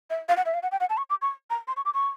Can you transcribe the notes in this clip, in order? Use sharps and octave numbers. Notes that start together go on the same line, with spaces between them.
E5
F5
F#5
E5
F5
F#5
G5
F#5
A5
C#6
D6
C#6
A#5
C6
C#6
D6
C#6